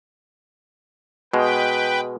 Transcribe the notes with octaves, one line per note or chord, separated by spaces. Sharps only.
B2 G#3 B4 G5